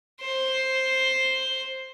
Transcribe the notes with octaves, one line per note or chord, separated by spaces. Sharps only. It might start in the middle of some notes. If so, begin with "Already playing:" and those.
C5